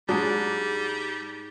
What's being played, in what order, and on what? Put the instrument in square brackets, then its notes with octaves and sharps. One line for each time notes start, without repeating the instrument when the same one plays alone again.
[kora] G#2 G#4 [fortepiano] F#3 D4 [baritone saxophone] G3